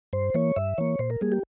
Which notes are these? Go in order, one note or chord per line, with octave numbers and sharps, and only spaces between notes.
G2 C5
E3 A#3 C#5
G2 E5
E3 A#3 C#5
A#2 C5
A#4
G3 A#3 G#4
G4